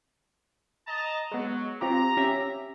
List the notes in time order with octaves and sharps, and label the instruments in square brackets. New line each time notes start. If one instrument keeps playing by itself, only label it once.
[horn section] D#5 A5 A#5
[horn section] F#3 [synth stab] G#3 B3
[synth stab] C4 F4 G4 [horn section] A#5
[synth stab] C#4 G4 E5